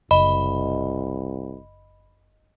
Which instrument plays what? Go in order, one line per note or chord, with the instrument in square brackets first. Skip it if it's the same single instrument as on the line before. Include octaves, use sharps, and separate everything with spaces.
[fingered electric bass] F#1 [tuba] C2 [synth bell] D#5 [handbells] B5